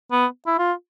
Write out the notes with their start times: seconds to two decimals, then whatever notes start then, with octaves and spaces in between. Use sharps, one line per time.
0.12 B3
0.46 E4
0.58 F4